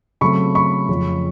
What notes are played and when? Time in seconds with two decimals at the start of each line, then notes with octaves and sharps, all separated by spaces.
0.21 C#3 F#3 A3 C4 B5 C#6
0.55 B5 C#6
0.89 F2 C#3 F3